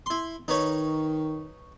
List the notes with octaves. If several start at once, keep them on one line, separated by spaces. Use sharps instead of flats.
E4 C6
D#3 D#4 B4 C#5